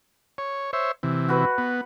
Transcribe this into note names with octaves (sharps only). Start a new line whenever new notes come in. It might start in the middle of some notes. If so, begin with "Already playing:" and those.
C#5
C5 C#5 E5
C3 E3
F#4 B4
B3